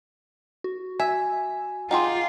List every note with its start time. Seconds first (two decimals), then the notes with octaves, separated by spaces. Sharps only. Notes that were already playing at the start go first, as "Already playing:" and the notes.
0.64 F#4
1.00 E5 G#5
1.91 D#4 F4 G4 G#4 F#5 G5 C6